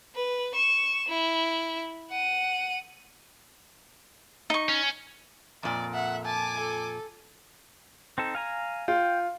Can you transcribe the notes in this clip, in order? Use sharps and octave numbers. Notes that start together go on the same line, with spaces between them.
B4
C#6 E7
E4
F#5 D#7
D#4 C#6
C#4
F2 A#2 D5
E5 F#5
G#5 A5 D6
A4
C4 D#4 A4
F5 G#5 A#5
F4 G5